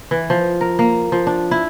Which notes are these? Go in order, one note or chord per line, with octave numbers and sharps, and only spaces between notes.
E3
F3
A#4
A#3
F3
D4
E4